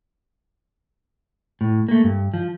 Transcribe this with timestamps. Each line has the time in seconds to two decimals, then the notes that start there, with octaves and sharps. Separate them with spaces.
1.61 A2
1.88 A3 A#3
2.04 G2
2.34 F3